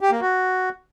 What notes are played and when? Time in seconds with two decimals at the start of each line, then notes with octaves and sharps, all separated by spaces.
0.01 G4
0.11 A#3
0.21 F#4